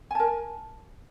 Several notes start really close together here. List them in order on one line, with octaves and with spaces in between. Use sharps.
G#5 A5 A#4